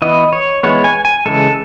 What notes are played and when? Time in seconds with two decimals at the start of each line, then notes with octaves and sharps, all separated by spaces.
0.02 E3 B3 D#5
0.33 C#5
0.63 E3 G#3 B3 C#5
0.84 G#5
1.05 G#5
1.26 C#3 E3 G#3 A4